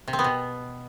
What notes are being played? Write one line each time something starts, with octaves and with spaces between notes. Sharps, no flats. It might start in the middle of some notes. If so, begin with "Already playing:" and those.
C3
C4
B3
B2